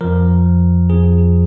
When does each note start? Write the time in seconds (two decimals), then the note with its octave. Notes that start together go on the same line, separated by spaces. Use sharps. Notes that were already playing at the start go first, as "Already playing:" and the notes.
0.01 F2 F3 A#4
0.89 F2 F3 G#4